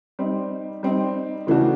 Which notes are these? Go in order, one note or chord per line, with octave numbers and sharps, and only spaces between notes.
G3 C4 D#4
G3 C4 D#4
C#3 E3 A3 D4 F#4